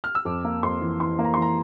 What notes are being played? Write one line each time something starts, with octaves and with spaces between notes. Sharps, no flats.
F6
E6
F2 D6
A#3
F2 C6
E3
E3 C6
A#3
A#5
C6
E3 A#5